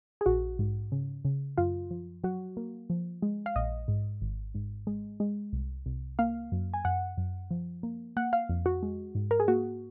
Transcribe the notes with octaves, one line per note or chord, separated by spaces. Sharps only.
G#4
A#1 F#4
G#2
C#3
C#3
F#2 F4
F3
F#3 F#4
A#3
F3
G#3
F5
A#1 D#5
G#2
G#1
G#2
G#3
G#3
C2
C2
A#3 F5
F#2
G#5
F#2 F#5
F#2
F3
A#3
A#3 F#5
F5
F2
F#4
G#3
G#2
A#4
G#4
A#3 F#4